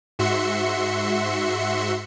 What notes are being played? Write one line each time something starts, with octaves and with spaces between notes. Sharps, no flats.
G#2 F#4 E5 C6 C#7